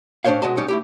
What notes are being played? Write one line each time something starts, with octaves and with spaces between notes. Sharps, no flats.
A2 C#4 D4 C5 C#5 F5
B2 G#3 F#4 D#5 A5 C6
B1 B2 G3 C#4 D#4 C#5
A3 E4 G4